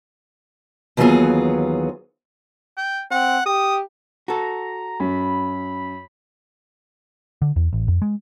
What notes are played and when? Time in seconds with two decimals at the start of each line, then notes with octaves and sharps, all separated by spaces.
0.97 D#2 E3 F#3 B3 F4 G#4
2.77 G5
3.11 C4 F#5
3.46 G4 D#6
4.28 F#4 A4 A#5
5.00 F#2 B5
7.42 D3
7.56 E2
7.73 A1
7.88 F2
8.02 G#3